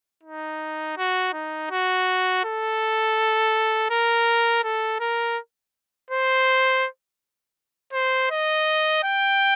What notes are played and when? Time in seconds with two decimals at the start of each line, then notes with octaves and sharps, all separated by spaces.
0.24 D#4
0.98 F#4
1.34 D#4
1.71 F#4
2.45 A4
3.91 A#4
4.64 A4
5.00 A#4
6.11 C5
7.93 C5
8.31 D#5
9.04 G5